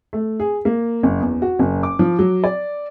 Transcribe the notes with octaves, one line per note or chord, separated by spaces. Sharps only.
A3
G#4
A#3
F#1
E2
F#4
F#1
D6
F3
F#3
D5